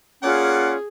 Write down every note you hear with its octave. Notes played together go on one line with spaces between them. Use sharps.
A#3 C#4 F4 G#4 D5 F#5